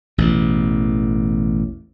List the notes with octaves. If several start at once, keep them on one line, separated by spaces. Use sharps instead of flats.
A1 E2 B2